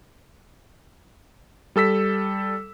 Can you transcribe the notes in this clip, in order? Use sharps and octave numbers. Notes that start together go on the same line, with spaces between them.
G3 A4 E6 B6